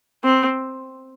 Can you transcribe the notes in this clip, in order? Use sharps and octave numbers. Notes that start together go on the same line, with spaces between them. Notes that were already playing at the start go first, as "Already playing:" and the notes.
C4